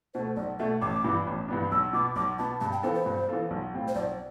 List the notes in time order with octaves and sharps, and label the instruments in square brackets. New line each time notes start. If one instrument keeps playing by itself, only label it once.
[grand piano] B2 A3 [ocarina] C5
[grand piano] B1 [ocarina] D5
[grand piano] B2 A3 [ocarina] E5
[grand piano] A1 [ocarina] D6
[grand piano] G2 E3 B3 D4
A1
G2 E3 B3 D4
[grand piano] B1 [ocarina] E6
[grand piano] B2 B3 [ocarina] D6
[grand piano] B1 [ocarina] D6
[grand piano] B2 B3 [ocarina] A5
[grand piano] G2 [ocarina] A5
[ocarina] G5
[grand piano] E3 B3 F4 A4 [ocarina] C5
[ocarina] C5
[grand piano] G2
E3 B3 F4 A4
B1
A2 G3 C4 F4
[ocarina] C5
[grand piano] B1 [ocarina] D5